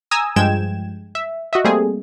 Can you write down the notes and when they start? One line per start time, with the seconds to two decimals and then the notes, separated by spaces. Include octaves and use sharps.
0.11 G#5 A#5 D#6 E6
0.36 G2 F3 G#3 G5 G#6 E7
1.15 E5
1.53 F#4 D#5 E5
1.64 G3 A3 A#3 C4 G#4